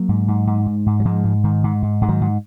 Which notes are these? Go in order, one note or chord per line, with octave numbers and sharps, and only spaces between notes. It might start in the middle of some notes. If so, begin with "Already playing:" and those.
Already playing: F#3 A#3
G#2
G#2
G#2
G#2
G#2
F#3
G#2 F3 G#3
G#2
G#2 D#3
G#2
G#2
G#2 G#3
D#3 F#3
G#2